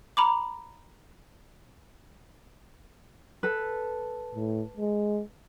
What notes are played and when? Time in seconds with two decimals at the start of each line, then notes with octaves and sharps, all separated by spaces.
0.17 A#5 B5 D6
3.43 A4 B4
4.35 A2
4.77 G#3